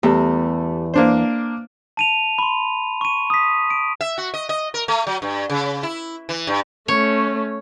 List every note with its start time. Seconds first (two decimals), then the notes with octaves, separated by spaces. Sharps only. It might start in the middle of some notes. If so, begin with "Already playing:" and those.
0.03 E2 G3 A3
0.94 A#3 D4 C5
1.97 A5 D#7 F7
2.38 B5 C6
3.01 C#6 D#7
3.30 D#6 B6
3.70 D7
4.01 E5
4.18 F#4
4.34 D#5
4.49 D#5
4.74 A#4
4.88 A3
5.07 F#3
5.22 G2
5.50 C#3
5.83 E4
6.29 E3
6.47 G2
6.88 A3 C#4 C#5